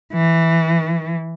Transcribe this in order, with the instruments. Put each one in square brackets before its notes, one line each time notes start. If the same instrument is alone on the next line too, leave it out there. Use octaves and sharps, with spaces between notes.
[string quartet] E3